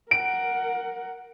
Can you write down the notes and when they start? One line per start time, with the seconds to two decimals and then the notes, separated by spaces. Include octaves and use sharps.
0.11 A#4 F#5 D7